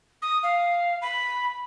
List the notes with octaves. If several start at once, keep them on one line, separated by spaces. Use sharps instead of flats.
D#6
F5
B5